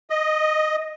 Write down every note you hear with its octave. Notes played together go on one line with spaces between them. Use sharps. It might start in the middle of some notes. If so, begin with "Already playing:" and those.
D#5